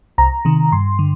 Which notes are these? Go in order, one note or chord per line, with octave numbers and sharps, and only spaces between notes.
C2 A#5
C3 D#3
G2 C6
D3